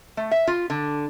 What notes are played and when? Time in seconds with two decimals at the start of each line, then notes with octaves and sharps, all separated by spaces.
0.17 A3
0.31 E5
0.47 F4
0.70 D3